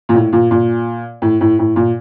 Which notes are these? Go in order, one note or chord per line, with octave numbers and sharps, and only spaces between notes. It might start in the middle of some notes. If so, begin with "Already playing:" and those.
A#2
A2
A#2
A#2
A2
A2
A2
A#2